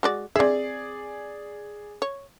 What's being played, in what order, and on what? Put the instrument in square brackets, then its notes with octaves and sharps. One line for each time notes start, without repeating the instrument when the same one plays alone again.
[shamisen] G#3 F#4 D5
[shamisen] C4 E5 [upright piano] G#4 D5
[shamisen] C#5